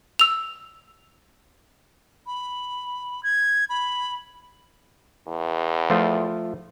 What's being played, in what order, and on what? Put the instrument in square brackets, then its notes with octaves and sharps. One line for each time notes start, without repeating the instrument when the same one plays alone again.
[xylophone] E6 F7
[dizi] B5
G#6
B5
[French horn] E2
[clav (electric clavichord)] F3 A3 F4